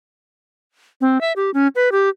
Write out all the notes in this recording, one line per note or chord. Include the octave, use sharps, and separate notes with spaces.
C4
E5
G4
C#4
B4
G4